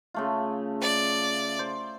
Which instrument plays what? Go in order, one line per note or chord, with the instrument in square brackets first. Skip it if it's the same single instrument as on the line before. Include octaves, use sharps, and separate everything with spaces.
[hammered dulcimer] C#3 A3 F4
[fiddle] D5
[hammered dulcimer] C5